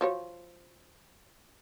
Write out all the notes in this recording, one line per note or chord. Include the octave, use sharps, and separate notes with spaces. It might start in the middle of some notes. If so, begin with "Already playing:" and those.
F3 F#4 C#5